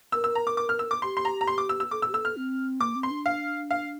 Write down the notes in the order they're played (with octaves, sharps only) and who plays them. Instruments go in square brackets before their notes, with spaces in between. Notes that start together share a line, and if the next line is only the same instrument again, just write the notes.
[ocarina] A#4 [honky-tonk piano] E6
[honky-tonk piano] E6
A#5
D6
D6
F6
E6
D6
[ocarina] G4 [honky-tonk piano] C6
[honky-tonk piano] C6
A#5
A#5
C6
D6
E6
E6
[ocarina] A4 [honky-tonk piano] D6
[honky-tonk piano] E6
[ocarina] G4
[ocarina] A4 [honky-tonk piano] E6
[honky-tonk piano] F6
[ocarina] C4
[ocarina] A#3 [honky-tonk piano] D6
[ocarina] C4
[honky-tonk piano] C6
[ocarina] D4
[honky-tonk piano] F5
F5